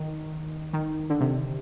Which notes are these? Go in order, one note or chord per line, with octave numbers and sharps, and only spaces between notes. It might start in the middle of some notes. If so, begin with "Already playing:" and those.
Already playing: D#3
D#3
D3
C3